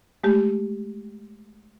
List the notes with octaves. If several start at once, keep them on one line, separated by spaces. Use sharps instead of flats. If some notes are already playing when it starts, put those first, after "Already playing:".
G#3 A3 G4